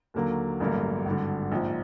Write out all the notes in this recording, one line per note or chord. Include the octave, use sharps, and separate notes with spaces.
D#2 D3 F#3 A#3
A1 G2 D3 F#3 A#3
G#1 G2 D3
A#1 G#2 F3